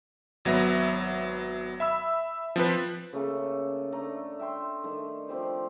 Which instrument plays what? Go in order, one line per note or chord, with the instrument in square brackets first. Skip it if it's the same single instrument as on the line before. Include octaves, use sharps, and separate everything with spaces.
[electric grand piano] G#1 F#3 B3 E5 A#6
E5 B5 E6
F3 C4 B4
[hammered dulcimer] C#3 A3 A#3 A4
A3 D4 A#5
E5 G5 C6
D#3 A3 D4
F3 C4 G4 C5